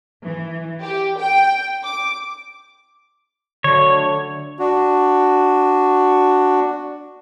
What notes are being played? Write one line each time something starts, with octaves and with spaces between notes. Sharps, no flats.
E3
G4
G5
D6
D3 F#3 A3 D4 C#5
D4 F#4